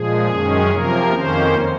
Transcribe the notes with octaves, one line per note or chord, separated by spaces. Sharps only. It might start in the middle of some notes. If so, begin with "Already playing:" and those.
Already playing: A#2 F3 G#3 G#4
F#2 D#3 G#3 C#4
C3 F3 A#3 A#4
F2 D#3 A#3 C#4 C5